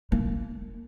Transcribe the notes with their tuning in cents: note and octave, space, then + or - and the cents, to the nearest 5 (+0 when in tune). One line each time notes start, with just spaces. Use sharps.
A#3 -20 E4 +0